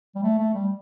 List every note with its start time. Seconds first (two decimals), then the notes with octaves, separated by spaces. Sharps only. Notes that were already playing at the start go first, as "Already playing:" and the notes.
0.15 G3
0.23 A3
0.38 A3
0.54 G3